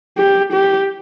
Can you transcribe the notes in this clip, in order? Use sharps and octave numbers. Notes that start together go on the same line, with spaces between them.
G4
G4